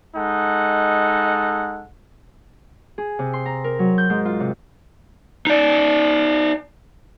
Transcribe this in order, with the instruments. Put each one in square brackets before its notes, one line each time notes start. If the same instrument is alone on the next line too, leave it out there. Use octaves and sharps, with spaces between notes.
[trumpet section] G#3 D#4 A4 F#5
[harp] G#4
C3
C6
A#5
A#4
F#3
G6
G#2
F4
C3
[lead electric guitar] D#4 D5